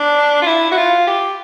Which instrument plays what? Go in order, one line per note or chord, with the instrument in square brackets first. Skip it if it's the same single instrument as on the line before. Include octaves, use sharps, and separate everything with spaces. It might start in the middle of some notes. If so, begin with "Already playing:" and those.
Already playing: [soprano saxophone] D4
F4
E4
F#4
F4
G4